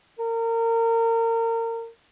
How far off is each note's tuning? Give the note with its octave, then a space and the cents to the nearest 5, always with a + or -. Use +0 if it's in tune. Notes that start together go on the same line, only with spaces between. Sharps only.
A#4 -30